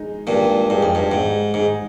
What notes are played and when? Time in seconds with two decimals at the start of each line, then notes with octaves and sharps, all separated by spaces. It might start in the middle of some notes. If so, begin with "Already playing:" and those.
Already playing: G#3 D#4 G#4
0.27 G2 A#2 G#3
0.70 G2 D#4 G#4
0.83 F2
0.95 G2
1.11 G#2 G#3
1.54 G#2 D#4 G#4